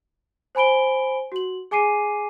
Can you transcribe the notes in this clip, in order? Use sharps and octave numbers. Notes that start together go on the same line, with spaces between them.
C5 G#5 B5 D7 G7
F#4 F#7
G#4 G#5 D6 C7 D#7